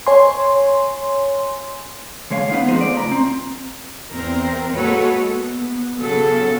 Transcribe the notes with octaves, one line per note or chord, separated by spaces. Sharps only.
C#5 G#5 C6
D3 G#3 C#5 F5
B3 D#4 F5
D2 F3 G#3 B3 C4 C5
A3 D5
C#2 G2 A#5
C4
E2 C4 A#4
G#3 A#3 F#4 A4 B4 C#5
B3
C#3 F#3 B3 F#4 A4